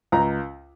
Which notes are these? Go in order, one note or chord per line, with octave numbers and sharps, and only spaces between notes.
C#2 A#5